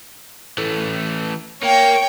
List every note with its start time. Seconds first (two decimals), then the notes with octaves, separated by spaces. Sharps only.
0.58 E3 A3
1.63 A#3 C#5 G5